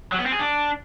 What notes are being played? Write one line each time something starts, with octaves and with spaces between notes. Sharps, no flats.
F#3
B3
C4
G#4
D4